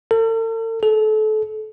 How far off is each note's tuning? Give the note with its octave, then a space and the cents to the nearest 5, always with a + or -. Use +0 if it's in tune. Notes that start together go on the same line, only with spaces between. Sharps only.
A4 +45
A4 -30